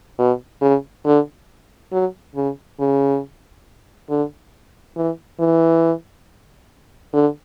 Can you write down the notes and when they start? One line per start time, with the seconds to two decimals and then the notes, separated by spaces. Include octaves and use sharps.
0.19 B2
0.62 C#3
1.06 D3
1.92 F#3
2.36 C#3
2.80 C#3
4.10 D3
4.96 E3
5.40 E3
7.13 D3